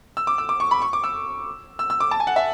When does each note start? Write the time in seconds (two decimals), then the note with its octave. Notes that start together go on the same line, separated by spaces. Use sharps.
0.17 E6
0.27 D6
0.38 E6
0.49 D6
0.60 C#6
0.71 B5
0.82 C#6
0.93 D6
1.04 E6
1.79 E6
1.90 E6
2.00 D6
2.11 A5
2.20 G#5
2.27 F#5
2.36 E5